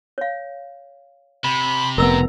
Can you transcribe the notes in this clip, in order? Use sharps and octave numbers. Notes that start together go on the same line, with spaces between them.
C#5 F5
C3 B5
F1 B3 A#4 D#5 A#5 E6